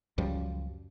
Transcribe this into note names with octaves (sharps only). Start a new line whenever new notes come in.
C#2 F#2 F3 G3